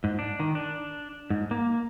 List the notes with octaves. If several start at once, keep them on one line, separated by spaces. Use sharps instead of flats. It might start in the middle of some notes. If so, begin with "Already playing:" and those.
G#2
D4
D#3
D4
G#2
A#3